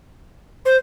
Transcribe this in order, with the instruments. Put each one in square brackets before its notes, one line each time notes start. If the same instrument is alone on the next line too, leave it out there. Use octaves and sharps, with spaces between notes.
[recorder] C5